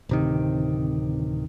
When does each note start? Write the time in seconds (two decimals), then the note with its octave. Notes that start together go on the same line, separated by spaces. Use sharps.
0.09 D1 C3 D#3